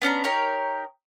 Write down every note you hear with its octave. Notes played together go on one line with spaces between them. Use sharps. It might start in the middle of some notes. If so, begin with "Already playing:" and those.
B3 C#4 D4 A#5
D#4 G4 A#4 C#5